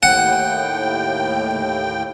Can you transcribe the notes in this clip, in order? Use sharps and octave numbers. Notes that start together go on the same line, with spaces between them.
D#2 A2 F#5 G5